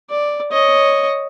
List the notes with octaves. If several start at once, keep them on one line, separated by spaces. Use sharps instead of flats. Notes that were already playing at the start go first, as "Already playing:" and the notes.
D5
C#5 D#5